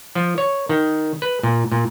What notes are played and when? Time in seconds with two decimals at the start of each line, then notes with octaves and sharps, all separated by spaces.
0.15 F3
0.38 C#5
0.69 D#3
1.22 B4
1.43 A#2
1.72 A#2